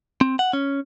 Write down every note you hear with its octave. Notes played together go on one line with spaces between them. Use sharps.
C4
F#5
C#4